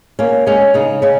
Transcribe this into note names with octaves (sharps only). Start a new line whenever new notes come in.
A#3 C#4
G#3 C#4
C#3 D#4
C#3 C#4